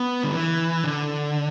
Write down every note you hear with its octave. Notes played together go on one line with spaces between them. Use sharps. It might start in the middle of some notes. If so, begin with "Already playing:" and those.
Already playing: B3
D3
E3
D3